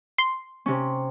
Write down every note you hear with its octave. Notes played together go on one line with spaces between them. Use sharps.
C6
C3 C#4